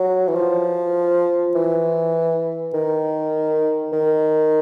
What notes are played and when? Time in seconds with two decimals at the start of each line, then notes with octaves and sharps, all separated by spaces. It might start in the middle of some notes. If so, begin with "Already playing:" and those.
Already playing: F#3
0.27 E3
0.36 F3
1.55 E3
2.74 D#3
3.93 D#3